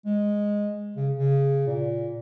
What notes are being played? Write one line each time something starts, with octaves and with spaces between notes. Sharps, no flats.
G#3
C#3
C#3
A#2